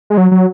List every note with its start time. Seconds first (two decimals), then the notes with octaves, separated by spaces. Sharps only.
0.10 G#3
0.17 F#3
0.31 F#3